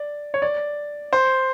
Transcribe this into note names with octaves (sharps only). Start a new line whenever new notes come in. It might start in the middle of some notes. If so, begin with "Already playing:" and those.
Already playing: D5
C#5
D5
C5